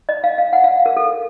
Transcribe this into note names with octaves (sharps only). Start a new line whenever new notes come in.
D#5
F5
F5
F#5
F5
A#4
A4